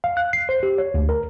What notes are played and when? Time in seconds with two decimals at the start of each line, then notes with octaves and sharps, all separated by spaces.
0.04 F5
0.17 F#6
0.33 C7
0.49 C5
0.63 G4
0.78 C#5
0.94 D2
1.09 A#4